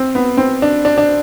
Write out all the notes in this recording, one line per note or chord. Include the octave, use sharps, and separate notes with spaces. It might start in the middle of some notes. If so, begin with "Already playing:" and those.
Already playing: C4
B3
C4
D4
D4
D4